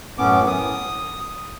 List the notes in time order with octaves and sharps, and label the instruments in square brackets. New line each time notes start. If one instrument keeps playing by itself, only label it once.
[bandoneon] F#2 A2 B3 C#4 D6
D#6